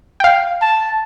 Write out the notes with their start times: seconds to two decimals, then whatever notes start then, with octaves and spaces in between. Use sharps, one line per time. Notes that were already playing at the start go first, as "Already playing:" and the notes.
0.20 F5 G5
0.62 A5